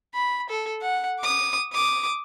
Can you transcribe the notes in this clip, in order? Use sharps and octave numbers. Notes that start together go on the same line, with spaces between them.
B5
A4
F#5
D6 D#6
D6 D#6